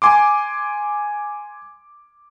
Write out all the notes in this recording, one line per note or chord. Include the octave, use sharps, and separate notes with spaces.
G#5 C6 D6